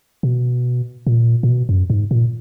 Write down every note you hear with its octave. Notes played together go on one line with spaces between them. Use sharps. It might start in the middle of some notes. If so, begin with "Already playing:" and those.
B2
A#2
A#2
B2
F#2
G#2
A#2